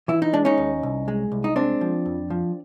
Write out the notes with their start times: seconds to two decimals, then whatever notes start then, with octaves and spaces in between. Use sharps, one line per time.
0.08 E3 E4
0.22 D#4
0.33 G#3 D4
0.45 C#4 D#4
0.58 D#2
0.83 C2
1.08 G#3
1.32 C2
1.44 D#4
1.56 G#3 C4 D4
1.81 F3
2.06 F2
2.30 F3